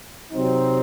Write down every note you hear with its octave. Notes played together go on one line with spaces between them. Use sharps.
C3 F#3 C4 D#4